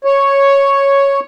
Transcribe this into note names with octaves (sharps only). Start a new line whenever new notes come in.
C#5